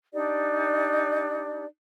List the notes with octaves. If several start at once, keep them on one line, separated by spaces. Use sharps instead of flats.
D4 D#4 G4 D5